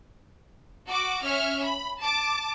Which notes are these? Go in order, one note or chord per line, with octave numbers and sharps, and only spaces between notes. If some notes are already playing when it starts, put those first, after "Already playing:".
F#4 D6
C#4 E5 F6
B5
A5 D6